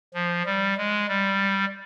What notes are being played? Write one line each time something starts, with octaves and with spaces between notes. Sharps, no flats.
F3
G3
G#3
G3